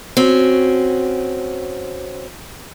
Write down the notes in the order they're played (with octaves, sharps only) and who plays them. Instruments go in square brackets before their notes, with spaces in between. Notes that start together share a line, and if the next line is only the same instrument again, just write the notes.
[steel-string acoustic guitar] C4 C#4 F#4